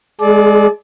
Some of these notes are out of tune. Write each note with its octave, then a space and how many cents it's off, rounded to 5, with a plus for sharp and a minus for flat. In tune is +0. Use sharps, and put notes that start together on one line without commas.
G#3 +0 G#4 +45 D5 +0